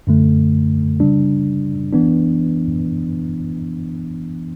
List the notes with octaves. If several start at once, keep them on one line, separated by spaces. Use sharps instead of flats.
F#2 D3 A3
C#3 G3 D4
E3 B3 D4